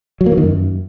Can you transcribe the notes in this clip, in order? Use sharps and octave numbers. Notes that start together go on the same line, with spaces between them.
F#3
A#3
E3
D#3
F#2